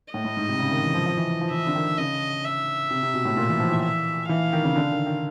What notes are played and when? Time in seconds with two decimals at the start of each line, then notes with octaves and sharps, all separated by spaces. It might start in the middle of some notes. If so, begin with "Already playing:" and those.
0.13 A2 D#5
0.25 A2
0.37 G#2
0.49 C3
0.60 C#3
0.71 D#3
0.83 E3
0.95 F3
1.06 F3
1.17 E3
1.29 E3
1.41 F3
1.52 E3 E5
1.67 D3
1.75 D#3
1.98 C#3 D#5
2.45 E5
2.91 C3
3.03 C3
3.14 B2
3.25 A2
3.37 A#2
3.49 E3
3.60 F3
3.71 E3
3.83 E5
4.29 E3 F5
4.53 D#3
4.64 C#3
4.76 D3
4.91 D#3
5.06 D#3